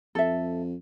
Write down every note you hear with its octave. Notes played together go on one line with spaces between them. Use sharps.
F2 A4 E5